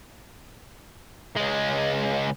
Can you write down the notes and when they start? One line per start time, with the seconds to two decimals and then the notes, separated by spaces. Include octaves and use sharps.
1.36 C#2 G#3